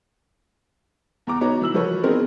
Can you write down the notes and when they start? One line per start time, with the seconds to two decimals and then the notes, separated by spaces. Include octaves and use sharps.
1.27 E2 A#5 D6
1.41 B3 D#4 F#4 C#5 A#5
1.61 E3 E6 F#7
1.74 F3 F#4 A#4 B4 C#5
2.03 B3 C4 D#4 G#4 A#4 C5